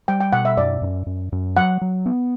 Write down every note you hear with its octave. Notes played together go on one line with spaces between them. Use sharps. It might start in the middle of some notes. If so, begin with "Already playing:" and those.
G3 G5
G5
B2 F#5
E5
F#2 D5
F#2
F#2
F#2
F#3 F#5
F#3
B3